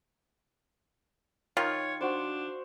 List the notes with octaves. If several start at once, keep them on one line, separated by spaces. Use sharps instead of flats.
D#3 F4 C#5
D4 F#4 C5